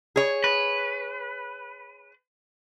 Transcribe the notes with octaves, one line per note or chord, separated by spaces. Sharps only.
G#4 C#5
B4